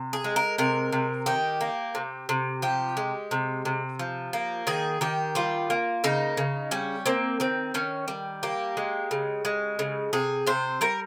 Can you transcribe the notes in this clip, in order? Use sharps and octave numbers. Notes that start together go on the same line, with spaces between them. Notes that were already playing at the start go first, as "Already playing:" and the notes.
Already playing: C3
G#4
G#3
A#4
C3 A#4
C3
D#3 G4
A#3
C3
C3
F3 G4
G#3
C3
C3
F3
A#3
D#3 G#4
D#3 G4
G3 F4
A#3
C#3 D#4
C#3
G3 C#4
A#3 C4
D#3 C4
D#3 C#4
G3
A#3 G4
G#3
C#3
G#3
C#3
C3 G#4
C3 C5
G3 A#4